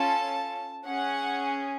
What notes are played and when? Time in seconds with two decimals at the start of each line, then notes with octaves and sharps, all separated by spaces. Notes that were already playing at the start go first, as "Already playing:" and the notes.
Already playing: C#4 F4 A4 A5
0.85 C#4 G#4 F#5